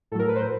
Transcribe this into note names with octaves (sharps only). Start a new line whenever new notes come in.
A2 F#3 A4 A#4
B4
C5